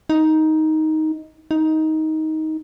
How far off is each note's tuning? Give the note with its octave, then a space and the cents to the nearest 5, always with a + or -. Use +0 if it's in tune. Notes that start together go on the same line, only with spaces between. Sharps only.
D#4 +10
D#4 +15